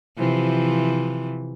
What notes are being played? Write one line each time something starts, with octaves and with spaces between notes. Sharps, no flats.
C3 E3 F3